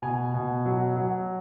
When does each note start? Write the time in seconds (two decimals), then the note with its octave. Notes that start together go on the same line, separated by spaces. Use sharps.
0.02 B2 G#5
0.34 B2
0.66 F#3
0.96 F#3